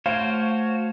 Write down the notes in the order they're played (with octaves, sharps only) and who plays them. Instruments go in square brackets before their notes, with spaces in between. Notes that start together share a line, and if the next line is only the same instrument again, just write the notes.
[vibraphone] A3 [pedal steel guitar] F#4 C5 C#5 [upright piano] F5 D7